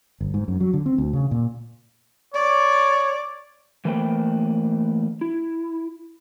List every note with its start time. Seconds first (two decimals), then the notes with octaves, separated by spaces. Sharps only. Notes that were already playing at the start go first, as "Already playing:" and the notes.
0.21 G1
0.34 G#2
0.48 F#2
0.60 F#3
0.74 D3
0.86 C4
0.98 D2
1.13 C#3
1.31 A#2
2.34 C#5 D5
3.85 E3 A3 A#3 B4 C5 G5
5.21 E4